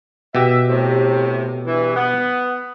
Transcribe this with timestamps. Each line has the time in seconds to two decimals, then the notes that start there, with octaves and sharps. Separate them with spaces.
0.35 B2 G4 E5
0.69 A2 C3
1.66 G2 E3
1.95 B3